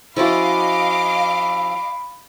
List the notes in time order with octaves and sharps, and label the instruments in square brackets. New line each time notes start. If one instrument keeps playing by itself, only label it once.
[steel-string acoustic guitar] F3 C#4 F#4 [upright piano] E4 [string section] D#5 F5 D6 [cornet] B5